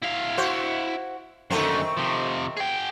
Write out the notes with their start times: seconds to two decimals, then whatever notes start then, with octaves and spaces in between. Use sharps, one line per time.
0.03 E4 F5
0.37 F#4 C5
1.51 F#2 D3 D#3 A3 C4
1.97 C3 F3
2.57 G#4 G5